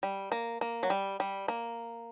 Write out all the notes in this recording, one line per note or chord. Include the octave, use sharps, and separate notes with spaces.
G3
A#3
A#3
F#3
G3
G3
A#3